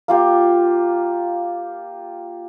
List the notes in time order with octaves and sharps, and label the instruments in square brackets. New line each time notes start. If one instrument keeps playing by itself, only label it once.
[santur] A#3 F4 G4